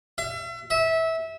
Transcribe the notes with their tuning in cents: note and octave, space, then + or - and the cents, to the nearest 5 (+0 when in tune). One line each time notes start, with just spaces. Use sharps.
E5 +40
E5 -20